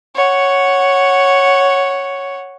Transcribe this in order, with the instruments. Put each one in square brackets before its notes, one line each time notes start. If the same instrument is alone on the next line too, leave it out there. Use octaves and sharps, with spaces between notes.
[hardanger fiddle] C#5 F#5